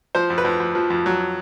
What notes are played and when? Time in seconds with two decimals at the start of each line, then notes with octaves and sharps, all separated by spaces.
0.15 F3 C5
0.30 F2
0.38 B4
0.45 F2
0.60 F2
0.75 F3
0.90 F2
1.06 F#3